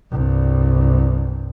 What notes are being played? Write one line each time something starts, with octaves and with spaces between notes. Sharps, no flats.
C2 G2